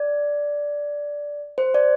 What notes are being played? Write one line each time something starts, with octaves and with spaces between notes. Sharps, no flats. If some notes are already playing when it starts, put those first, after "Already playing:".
Already playing: D5
C5
D5